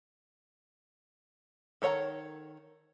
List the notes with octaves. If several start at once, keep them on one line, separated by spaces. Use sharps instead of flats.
D#3 A4 C#5 F#5 A#5